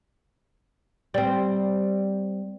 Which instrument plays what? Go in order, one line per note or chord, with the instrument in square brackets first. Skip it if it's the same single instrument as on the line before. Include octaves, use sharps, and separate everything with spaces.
[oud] G3 C4